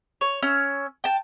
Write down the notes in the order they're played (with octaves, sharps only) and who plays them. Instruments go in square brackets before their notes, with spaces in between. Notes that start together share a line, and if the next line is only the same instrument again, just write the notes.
[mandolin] C#5
C#4 C#5 E6 F6
G5 A5